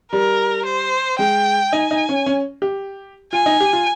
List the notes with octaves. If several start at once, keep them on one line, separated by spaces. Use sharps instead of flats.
G3 A#4
C5
G#3 G5
D#4 G#5
D#4
C#4
C#4
G4
F4 G#5
D#4
G4
F4